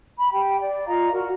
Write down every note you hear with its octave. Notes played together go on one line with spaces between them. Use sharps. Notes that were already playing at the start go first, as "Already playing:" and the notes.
B5
G4 G5
D5
F4 D#5 F5 A#5
F#4 A#4